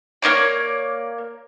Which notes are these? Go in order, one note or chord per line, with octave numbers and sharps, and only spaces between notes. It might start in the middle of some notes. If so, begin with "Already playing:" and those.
A#3 D#4 C#5 D5